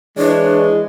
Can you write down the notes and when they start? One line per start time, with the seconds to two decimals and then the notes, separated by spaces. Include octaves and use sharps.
0.18 E3 G#3 D4 C#5